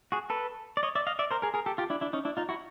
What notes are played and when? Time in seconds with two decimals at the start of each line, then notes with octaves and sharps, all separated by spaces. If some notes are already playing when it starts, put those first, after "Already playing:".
0.12 F#4 G#4
0.30 A4 B4
0.77 D5
0.83 C#5 D#5
0.95 D5 E5
1.07 D#5 F5
1.19 D5 E5
1.31 A#4 C5
1.42 G#4 A#4
1.54 G#4 A#4
1.66 G4 A4
1.78 F4 G4
1.90 D4 E4
2.01 D4 E4
2.13 C#4 D#4
2.25 D4 E4
2.37 D#4 F4
2.49 E4 F#4